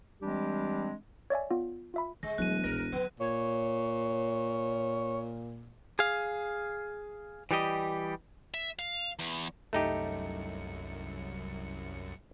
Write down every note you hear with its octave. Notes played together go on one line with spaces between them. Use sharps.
E3 G3 G#3 C4 D4 G4
C#5 D5 E5 G#5
B3 F4
F4 E5 B5
D3 G#3 A#6
E1 F#3 A3 F#6 D#7
A#1 A#4 A#6
D3 F#3 B3
A#2 C#5
G#4 F5
E3 G3 G4 D#5
E5
F5
E2
C2 F#2 A3 D#4 G4 C#7